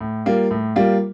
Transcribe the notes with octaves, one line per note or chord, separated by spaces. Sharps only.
A2
G3 A#3 F4
A2
G3 A#3 F4